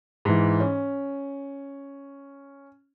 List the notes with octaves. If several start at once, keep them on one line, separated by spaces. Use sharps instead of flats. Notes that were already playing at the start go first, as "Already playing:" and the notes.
G#2 E3
C#4